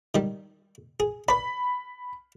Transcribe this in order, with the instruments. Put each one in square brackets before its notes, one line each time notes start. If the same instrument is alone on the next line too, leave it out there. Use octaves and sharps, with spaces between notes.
[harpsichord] D#3 G3
G#4
[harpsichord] B4 D5 [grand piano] B5